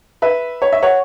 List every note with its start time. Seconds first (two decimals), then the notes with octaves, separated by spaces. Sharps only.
0.22 B4 E5
0.62 C#5
0.73 E5
0.82 C#5 F#5